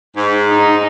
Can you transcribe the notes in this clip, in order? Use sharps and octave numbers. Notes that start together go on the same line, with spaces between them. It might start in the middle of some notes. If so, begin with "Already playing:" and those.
G#2
D#4